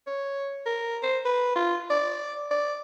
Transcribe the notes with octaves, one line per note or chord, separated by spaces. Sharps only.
C#5
A#4
C5
B4
F4
D5
D5